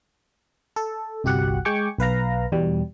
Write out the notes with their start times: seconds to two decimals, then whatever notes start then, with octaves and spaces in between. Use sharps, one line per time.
0.76 A4
1.24 G1 C2 F#4 G4 F#5
1.65 G#3 G5 G#5 C#6 D6
1.98 B1 B4 F5 A#5
2.52 E2 B2 G3